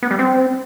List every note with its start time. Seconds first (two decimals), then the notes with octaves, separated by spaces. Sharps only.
0.03 B3
0.11 G3
0.19 C4